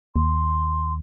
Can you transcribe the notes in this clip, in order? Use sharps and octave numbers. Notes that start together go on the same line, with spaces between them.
D#2 C6